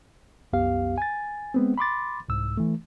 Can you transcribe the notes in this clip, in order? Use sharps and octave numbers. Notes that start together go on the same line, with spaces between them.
C2 F#2 B3 G4 F5
G#5 A6
G#3 B3 C4
B5 C6 D6 A6
C2 G#2 E6
E3 A3